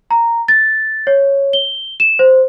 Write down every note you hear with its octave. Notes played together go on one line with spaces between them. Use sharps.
A#5
A6
C#5
G7
E7
C5